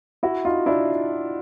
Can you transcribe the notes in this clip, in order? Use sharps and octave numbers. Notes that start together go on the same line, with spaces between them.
E4 F#4
D#4 F4
D4 E4